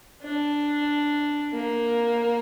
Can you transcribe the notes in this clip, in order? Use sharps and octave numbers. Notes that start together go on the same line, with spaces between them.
D4
A#3